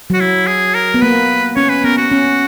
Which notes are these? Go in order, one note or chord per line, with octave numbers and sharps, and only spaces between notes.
F#3
F#4
E4
G#4
A#4
B3
A#3 B4
C#4 C#5
B4
B3 A#4
F#4
C#4